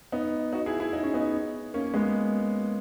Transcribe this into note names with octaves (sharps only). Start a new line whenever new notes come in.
B3 D#4
D#4 F#4
E4 G#4
E4 G#4
D#4
C#4
B3 D#4
A#3 C#4
G#3 B3